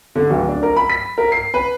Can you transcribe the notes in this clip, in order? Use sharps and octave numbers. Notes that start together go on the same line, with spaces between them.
D3
D1
D4
A#4
B5
B6
A#4
C7
B4